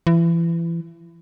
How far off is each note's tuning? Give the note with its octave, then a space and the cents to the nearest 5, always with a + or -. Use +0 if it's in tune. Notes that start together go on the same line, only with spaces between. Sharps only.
E3 +30